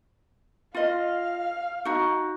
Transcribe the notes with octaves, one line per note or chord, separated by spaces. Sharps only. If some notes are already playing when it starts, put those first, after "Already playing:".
F4 D#5 F5
D#4 F#4